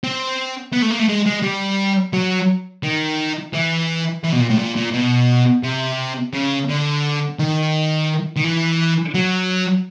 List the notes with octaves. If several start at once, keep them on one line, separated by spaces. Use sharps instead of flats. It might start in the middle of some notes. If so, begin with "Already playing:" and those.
C4
B3
A3
A#3
A3
G#3
G#3
G3
F#3
D#3
E3
E3
B2
A#2
A2
A#2
A#2
B2
C3
C#3
D3
D#3
D#3
E3
F#3